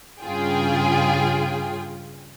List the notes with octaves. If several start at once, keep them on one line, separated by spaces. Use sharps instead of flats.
G2 C#3 F4 G#4 G5